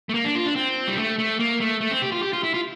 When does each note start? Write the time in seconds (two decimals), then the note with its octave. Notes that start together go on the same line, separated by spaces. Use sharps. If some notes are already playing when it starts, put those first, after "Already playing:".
0.09 A3
0.14 A#3
0.24 D4
0.35 F4
0.46 D4
0.56 C4
0.88 G3
0.98 A3
1.19 A3
1.39 A#3
1.60 A3
1.81 A3
1.91 C4
2.02 G4
2.12 F4
2.23 G4
2.33 F4
2.43 E4
2.54 F4